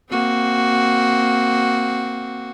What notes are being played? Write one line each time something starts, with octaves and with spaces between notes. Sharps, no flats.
A#3 C4 F#4